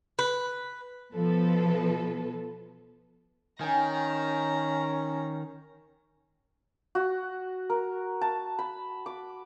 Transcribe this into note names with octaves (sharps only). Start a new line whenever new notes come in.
B4
B2 F3 A4 B4
D#3 C#4 G5 G#5 A#5
F#4
A#4
A5
B5
D6